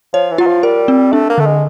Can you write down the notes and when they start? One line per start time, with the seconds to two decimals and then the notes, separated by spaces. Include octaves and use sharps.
0.13 F3 C#5
0.31 E3
0.38 F#3 F4
0.47 F3
0.63 G3 A#4
0.88 C4
1.13 A3 D4
1.30 A#3
1.38 D3 A3
1.46 G#3